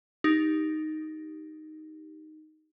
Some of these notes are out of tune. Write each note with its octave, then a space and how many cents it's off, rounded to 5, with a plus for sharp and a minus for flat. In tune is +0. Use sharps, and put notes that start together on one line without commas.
D#4 +0 G4 +0